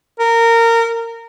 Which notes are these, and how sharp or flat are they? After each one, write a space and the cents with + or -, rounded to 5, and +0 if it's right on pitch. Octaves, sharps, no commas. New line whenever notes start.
A#4 -20